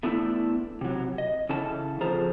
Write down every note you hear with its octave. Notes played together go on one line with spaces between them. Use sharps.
A3 B3 D4 E4 A4
C3 F#3
D#5
C#3 C#4 E4 A4 A5
F2 F3 G#4 A4 C5 A#5